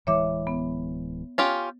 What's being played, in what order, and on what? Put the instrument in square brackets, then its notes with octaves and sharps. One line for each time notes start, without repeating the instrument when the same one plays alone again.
[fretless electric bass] D1 E3 G#3 [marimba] C#5 E5 D6
[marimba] B3
[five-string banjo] C#4 F4 G4